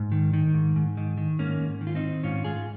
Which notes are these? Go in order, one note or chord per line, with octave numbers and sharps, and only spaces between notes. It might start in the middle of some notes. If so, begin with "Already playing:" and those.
Already playing: G#2
D#3
D#3
G#2
G#2
D#3
D#3
G#2 A#3 C#4
G#2
D#3
F4
C4 D#4
D#3
G#2 C#4 F4
G#2 F4 G#4